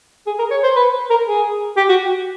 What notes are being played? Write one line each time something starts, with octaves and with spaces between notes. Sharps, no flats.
G#4
A#4
C#5
C5
B4
A#4
G#4
G4
F#4